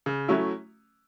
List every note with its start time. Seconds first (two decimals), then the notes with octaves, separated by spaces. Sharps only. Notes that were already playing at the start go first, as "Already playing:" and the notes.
0.06 C#3
0.28 F#3 A3 C#4 E4